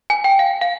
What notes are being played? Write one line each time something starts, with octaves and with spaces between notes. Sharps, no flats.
G#5
G5
F5
F5